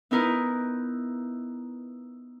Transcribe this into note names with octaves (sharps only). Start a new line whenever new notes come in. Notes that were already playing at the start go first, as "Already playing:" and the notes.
B3 D#4 E4 A#4 B4